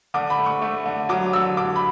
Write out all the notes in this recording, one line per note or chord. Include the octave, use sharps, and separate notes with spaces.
D3 D6
B5
A3
C#6
A3
D3
F#3 D6
D3 E6
D3 D6
B5